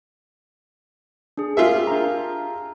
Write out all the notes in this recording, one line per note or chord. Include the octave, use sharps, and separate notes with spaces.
D4 G#4
F4 G4 G#4 A#4 E5
D4 A#5